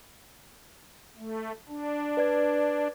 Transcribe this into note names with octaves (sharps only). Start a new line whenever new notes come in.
A3
D4
B4 D5 G#6